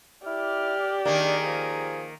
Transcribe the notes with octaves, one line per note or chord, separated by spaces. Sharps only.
E4 G4 D5 F6
D#3 A#3 D4 G#4
F3